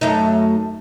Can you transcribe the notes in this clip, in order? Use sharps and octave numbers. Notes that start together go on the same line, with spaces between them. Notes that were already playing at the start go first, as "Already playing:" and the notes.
F#2 A3 D#4